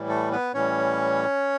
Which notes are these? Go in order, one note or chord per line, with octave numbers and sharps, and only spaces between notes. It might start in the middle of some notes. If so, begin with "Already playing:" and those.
Already playing: A2 E3 G3
A3 A4
B3 B4
A2 E3 G3 C#4 C#5